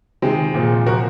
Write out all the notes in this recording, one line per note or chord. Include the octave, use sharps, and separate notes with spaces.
C3 D#3 G#3 C4
A#2 F3
C3 F3 F#4 A#4